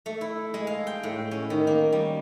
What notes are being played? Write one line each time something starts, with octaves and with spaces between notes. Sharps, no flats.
A3
E4
G#3
F5
G5
A2
C#4
D#3
A#3
G3